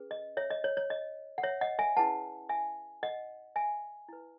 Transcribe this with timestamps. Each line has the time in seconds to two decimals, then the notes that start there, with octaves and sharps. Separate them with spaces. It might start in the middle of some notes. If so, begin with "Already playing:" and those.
Already playing: C#4 G#4 B4
0.11 D#5
0.37 C#5 E5
0.50 D#5
0.64 C#5
0.77 C#5
0.90 D#5
1.38 F#5
1.43 C#5 E5
1.61 D#5 F#5
1.79 E5 G#5
1.97 C#4 E4 G#4 B4 F#5 A5
2.49 E5 G#5
3.03 D#5 F#5
3.56 E5 G#5
4.09 E4 B4